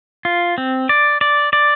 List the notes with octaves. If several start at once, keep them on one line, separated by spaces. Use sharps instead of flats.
F4
C4
D5
D5
D5